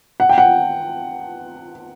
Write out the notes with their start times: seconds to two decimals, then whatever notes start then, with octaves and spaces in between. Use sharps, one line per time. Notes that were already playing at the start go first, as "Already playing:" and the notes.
0.20 F#5
0.29 G5
0.38 F#5